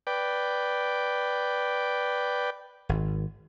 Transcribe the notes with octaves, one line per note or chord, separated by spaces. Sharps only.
B4 D5 G5
G#1